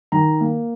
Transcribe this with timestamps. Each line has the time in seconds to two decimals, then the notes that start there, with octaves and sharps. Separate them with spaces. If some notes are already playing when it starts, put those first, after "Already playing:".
0.12 D#3 A#5
0.41 A#3